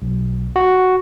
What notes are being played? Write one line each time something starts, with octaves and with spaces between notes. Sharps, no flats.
B1
F#4